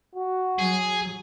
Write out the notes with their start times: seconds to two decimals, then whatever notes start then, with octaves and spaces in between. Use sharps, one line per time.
0.15 F#4
0.59 F#3 G#4